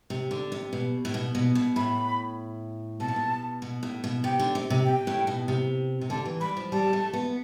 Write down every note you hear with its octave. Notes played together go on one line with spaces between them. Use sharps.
C3
D3
C3
B2
A2
B2
B2
B2
A2 B5
B2 A5
C3
B2
B2
A2
B2
C3 G5
D3
C3
C3
G5
A2
B2
C3
C3
D3 A5
E3
G3 B5
F3
G3 A5
A3
B3